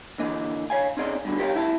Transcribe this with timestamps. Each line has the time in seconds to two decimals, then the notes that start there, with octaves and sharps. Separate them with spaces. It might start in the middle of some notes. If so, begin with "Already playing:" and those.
0.18 D3 E3 A#3 D#5
0.70 C#5 F5 G#5
0.97 C4 C#4 D#4 G#4 D5 D#5
1.25 G2 B2 D3
1.38 G4 A4 A#4 C5 C#5 F5
1.54 F2 E4 E5 A5